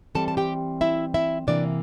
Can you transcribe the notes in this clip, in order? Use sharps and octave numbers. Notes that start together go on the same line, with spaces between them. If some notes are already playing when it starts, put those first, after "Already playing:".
E3 G3 C4 A4 A5
A5
G4 G5
E4 E5
E4 E5
C3 E3 A#3 D4 D5